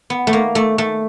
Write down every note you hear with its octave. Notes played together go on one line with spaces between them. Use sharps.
B3
A3
A#3
A3
A3